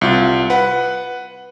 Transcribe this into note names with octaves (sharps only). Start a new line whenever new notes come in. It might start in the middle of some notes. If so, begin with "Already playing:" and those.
C2 F4
B4 F#5